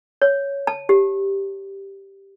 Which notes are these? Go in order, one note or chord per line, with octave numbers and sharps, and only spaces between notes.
C#5
A5
G4